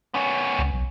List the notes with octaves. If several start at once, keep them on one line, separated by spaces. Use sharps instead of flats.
B3 C#4
C#2
B1